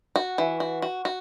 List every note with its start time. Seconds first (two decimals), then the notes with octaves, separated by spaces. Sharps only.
0.16 F#4
0.38 E3
0.60 F#4
0.82 F#4
1.05 F#4